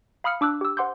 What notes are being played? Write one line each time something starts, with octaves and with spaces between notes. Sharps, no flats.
F5 B5 D#6 F6 C#7
D4 D6 E6 F#6
G4 E6
C5 F#5 C6 D6 G6